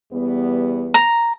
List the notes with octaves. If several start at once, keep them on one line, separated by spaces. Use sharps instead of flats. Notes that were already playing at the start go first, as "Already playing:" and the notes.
E2 G3 B3
A#5